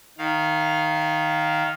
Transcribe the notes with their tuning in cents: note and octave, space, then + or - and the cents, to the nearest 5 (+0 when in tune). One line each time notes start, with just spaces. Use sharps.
D#3 +0 F5 +5